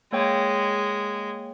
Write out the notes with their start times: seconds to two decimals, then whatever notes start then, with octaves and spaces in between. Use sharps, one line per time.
0.13 G#3 A#3 C#5 G5